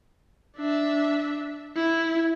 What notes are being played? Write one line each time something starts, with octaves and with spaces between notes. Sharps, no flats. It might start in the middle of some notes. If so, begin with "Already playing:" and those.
D4 E5
E4